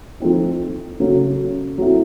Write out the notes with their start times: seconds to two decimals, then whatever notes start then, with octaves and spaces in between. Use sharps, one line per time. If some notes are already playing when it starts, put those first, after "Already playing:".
0.20 F3 A3 C4 D#4
1.00 C#3 F#3 A3 C#4
1.78 F#3 A3 C4 E4